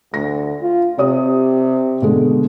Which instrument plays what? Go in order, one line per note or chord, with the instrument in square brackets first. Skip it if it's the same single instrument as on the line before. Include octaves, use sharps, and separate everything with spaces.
[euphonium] D2 [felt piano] A#6
[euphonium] F4
[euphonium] C3 [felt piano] G4 D5 D#6
[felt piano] B2 D3 G#3